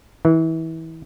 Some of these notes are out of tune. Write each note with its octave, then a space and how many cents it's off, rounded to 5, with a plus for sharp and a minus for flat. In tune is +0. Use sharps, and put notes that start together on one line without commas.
E3 -30